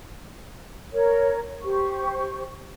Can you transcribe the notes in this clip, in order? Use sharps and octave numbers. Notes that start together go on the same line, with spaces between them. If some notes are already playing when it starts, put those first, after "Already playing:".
A#4 C#5
G4 C5 C#6